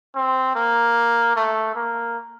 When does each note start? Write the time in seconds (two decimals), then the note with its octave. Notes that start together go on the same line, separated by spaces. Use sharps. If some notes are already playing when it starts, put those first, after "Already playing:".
0.15 C4
0.55 A#3
1.36 A3
1.75 A#3